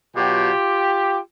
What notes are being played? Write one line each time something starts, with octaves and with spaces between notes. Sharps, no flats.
B2 F#3 F4 G4